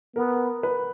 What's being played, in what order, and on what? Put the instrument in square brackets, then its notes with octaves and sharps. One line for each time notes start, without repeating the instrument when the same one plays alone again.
[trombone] B3 [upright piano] A#4
[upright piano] B4